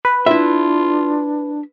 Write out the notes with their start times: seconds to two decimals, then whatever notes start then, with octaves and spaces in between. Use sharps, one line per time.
0.05 B4
0.26 D4 E4 F4 E5